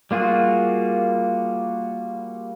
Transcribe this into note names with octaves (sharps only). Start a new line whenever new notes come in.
G3 A#3 F4 F#4 G#4